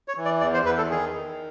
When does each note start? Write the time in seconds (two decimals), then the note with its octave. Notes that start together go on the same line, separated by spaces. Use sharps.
0.08 C#5
0.17 E3
0.25 D5
0.41 E2 D5
0.54 C5
0.65 E2 B4
0.77 A4
0.90 D#3 G#4
1.14 D#3